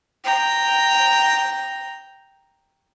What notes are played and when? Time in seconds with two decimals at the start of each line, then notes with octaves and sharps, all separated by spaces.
0.24 G5 A#5